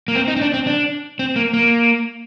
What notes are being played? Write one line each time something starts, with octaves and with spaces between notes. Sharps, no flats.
A#3
C4
D#4
C4
D4
C4
D4
C4
A#3
A#3